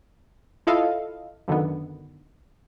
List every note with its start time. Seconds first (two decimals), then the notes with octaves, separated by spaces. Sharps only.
0.67 E4 F4 A4 D#5 F5
1.48 F#2 D3 D#3 B3